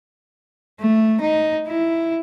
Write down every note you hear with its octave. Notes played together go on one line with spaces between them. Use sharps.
A3
D#4
E4